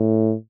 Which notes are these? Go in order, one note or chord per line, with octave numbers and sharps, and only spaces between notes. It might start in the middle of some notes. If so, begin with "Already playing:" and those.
Already playing: A2